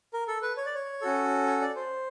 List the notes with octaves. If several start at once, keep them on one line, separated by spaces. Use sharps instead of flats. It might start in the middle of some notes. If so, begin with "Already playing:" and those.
A#4
A4
B4
C#5
D5
C#5
C#4 F#4 A4
C#5
D5
C5